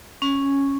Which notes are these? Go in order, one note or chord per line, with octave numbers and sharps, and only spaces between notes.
C#4